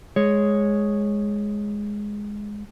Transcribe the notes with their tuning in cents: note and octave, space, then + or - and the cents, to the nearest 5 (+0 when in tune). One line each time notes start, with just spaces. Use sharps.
G#3 +0 C#5 +0